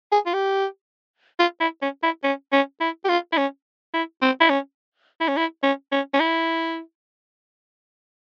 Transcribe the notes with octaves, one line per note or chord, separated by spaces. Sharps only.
G#4
F4
G4
F4
E4
C#4
E4
C#4
C#4
E4
G4
F4
E4
C#4
E4
C4
E4
C#4
E4
C#4
E4
C#4
C#4
C#4
E4